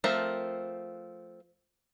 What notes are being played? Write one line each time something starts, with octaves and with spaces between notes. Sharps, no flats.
F3 A3 C4 A#4